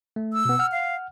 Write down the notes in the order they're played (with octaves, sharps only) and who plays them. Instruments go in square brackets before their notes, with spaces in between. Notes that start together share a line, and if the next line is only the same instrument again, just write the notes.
[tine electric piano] A3
[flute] E6
[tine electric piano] B2 B3
F#5 F6
[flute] F5